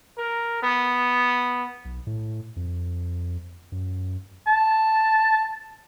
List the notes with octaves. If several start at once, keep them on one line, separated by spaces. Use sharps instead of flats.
A#4
B3
B1
A2
F2
F#2
A5